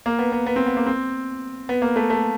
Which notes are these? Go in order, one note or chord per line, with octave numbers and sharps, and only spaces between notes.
A#3
B3
B3
B3
C4
B3
A#3
C4
B3
A#3
A3
A3